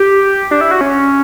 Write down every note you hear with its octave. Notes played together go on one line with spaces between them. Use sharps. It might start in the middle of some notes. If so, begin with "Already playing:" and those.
Already playing: G4
D4
E4
F#4
C#4